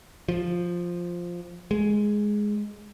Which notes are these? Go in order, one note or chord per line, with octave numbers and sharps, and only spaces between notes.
F3
G#3